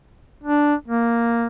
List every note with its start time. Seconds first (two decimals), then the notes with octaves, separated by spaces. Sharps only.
0.43 D4
0.88 A#3